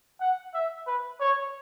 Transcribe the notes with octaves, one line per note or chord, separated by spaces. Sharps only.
F#5
E5
B4
C#5